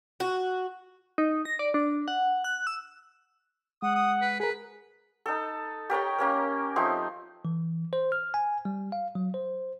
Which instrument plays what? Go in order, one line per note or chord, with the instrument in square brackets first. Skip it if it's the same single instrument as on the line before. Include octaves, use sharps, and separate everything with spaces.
[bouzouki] F#4
[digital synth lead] D#4
A#6
D5
D4
F#5
F#6
E6
[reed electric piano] G#3 [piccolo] F#5 [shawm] D#6
[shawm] D#6
B4
[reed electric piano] G#4 A#4 [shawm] B4
[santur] D#4 A4
G4 A#4 C#5 G5
A#3 C#4 A#4
F3 A3 C4 D#4
[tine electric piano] E3
C5
F6
G#5
G3
F5
F#3
C5